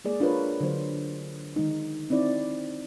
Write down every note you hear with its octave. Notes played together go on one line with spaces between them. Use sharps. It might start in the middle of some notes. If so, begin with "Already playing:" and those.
G#3 A#3 G#4 D5
D4 F4 A#4 B4 C#5
D3 F#3 C5
D#3 G#3 D#4
C4 D#4 E4 D5